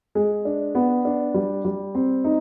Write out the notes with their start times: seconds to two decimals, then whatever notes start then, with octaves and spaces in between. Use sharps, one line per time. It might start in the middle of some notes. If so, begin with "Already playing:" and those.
0.15 G#3
0.45 D4
0.75 B3
1.05 D4
1.34 G3
1.65 G3
1.95 C4
2.24 D#4